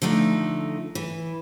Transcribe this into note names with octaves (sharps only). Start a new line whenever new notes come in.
D3 F3 A3 D#4
E3